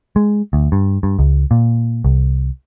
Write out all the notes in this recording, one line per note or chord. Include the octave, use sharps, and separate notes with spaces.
G#3
D2
G2
G2
C#2
A#2
C2